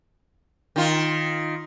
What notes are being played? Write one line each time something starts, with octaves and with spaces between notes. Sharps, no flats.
D#3 F4